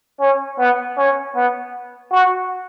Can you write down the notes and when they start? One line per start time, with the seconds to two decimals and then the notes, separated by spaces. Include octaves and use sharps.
0.20 C#4
0.59 B3
0.98 C#4
1.36 B3
2.12 F#4